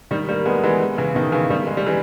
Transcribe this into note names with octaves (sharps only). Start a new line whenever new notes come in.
D#3 G3
G3 A#3
G#3 B3
E3 G#3
C#3 E3
B2 D#3
C#3 E3
D#3 G3
G#3
G3
E3 G#3